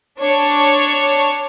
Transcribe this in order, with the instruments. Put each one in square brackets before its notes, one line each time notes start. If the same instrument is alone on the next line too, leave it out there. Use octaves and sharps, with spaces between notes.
[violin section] D4 C#5